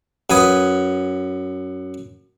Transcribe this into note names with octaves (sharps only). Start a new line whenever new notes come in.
F#2 B4 G#5 D#6